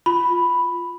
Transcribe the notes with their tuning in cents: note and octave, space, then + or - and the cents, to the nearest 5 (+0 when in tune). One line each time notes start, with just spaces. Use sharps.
F4 +0 B5 +0